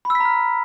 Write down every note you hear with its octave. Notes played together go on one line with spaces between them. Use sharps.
B5
E6
B6
A#5
F6